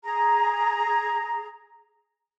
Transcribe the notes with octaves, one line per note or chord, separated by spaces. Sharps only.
G#4 A#5